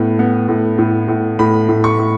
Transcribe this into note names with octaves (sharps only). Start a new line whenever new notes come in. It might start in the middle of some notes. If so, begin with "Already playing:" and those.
Already playing: A2 B3
B3
A2
A2
A2
A2 B5
A2
C#6
A2